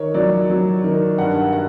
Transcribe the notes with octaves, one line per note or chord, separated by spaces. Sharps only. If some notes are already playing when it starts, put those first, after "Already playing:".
Already playing: D#3 C#5
F#3 D5
F#3
D#3
G2 F#5
F#5